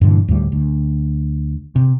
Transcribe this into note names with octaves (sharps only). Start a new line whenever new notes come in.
G2 A#2 D3 E3
D2 A2 G3
D2
C3